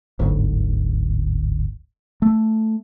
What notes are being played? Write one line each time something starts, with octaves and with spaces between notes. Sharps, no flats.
D1 G1 D2 G#2
A3